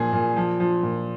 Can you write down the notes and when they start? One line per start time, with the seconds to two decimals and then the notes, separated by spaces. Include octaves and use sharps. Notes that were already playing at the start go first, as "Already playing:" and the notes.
Already playing: A#2 F3 G#4
0.13 A#2
0.37 F3
0.60 F3
0.83 A#2